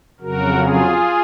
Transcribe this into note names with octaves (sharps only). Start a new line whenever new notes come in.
F2 C#3 F#3 F#4 A#4
F4 G#4